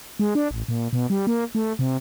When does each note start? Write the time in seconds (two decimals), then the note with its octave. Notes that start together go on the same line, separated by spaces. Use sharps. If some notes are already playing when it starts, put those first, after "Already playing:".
0.19 G#3
0.35 D4
0.51 A1
0.68 A#2
0.93 B2
1.10 G3
1.27 A#3
1.55 A3
1.79 C3